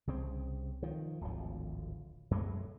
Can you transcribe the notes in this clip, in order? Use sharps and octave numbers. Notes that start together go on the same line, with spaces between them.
C2 C#3 C4
D#3 F3
D1 G#1 D2 F3
F#2 F#3 G#3 A3